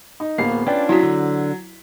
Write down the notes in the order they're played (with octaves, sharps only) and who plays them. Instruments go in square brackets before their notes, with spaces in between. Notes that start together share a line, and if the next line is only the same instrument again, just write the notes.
[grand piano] D#4
[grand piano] D1 B3 C7 [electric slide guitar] A#3
[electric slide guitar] C#4 D4 F4 [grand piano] B4 D5 G5
[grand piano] F#3 B6 [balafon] E4 F#4
[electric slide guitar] D3